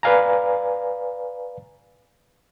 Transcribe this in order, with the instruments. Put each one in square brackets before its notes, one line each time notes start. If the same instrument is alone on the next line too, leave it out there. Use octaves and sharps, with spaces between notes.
[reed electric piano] B4 D5 F5 G#5 A#5